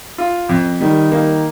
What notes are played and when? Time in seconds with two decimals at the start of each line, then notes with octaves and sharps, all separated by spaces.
0.18 F4
0.49 F2
0.81 D#3 G3
1.12 D#3 A#3